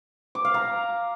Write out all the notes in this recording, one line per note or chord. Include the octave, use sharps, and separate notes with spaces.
D6
F5
A#5